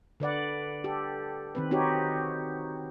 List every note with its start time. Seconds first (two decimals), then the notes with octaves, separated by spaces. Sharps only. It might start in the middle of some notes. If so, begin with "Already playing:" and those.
0.20 D3 B4 D5 F#5
0.84 G4 A4
1.55 D#3 C4 B4
1.71 C4 D#4 F#4 G4 C#5